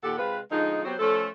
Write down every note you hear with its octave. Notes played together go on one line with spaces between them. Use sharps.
D#2 A#2 G4 A4 F#5
C3 G#3 F4 B4
D3 F3 G#3 D#4
F#3 B3 C4 F#4 G4 C5
F3 A3 C#4 A4